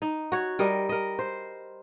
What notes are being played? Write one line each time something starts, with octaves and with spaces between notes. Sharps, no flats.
D#4
F#4 C#5
G3 A#4 D#5
A#4 D#5
C5